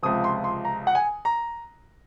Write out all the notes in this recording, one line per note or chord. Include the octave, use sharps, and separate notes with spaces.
C#2 C3 F3 D#6
C6
C6
A#5
F#5
G#5
A#5